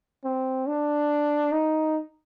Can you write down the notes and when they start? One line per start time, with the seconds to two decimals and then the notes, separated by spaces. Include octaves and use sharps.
0.25 C4
0.67 D4
1.52 D#4